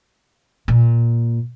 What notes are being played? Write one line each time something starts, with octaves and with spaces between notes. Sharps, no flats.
A#2